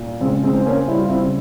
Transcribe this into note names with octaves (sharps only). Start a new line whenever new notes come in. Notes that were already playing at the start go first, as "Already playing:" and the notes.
Already playing: A#2
C#3 G#3 C4
G#3 C4
C4
A#3 C#4
G3 E4
F4
C4 E4
C#3